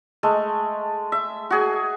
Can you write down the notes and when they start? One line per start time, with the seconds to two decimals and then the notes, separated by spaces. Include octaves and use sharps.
0.23 G#3 A3
1.12 E5
1.50 F#4 G#4 G#5